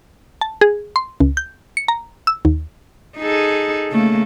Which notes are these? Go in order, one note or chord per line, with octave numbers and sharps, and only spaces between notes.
A5
G#4
C6
C#2
G6
C#7
A#5
E6
D#2
D#4 G#4 A4
C#3 A3 A#3